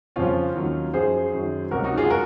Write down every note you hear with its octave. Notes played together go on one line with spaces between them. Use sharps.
F2 C#3 F3 C#4 F4
D#2 D#3 F#3
F#2 F3 G#4 C5
F#2 D#3 F#3
C#2 C3 F#3 F#4 A#4
D#4 F#4
F4 G#4
F#4 A#4